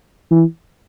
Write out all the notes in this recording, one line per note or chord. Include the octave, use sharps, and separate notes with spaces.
E3